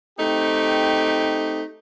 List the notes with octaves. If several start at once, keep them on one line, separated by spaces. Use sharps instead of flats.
A3 C4 D#4 G4